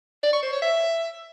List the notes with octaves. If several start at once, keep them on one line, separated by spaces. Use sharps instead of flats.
D5
C#6
C5
C#5
E5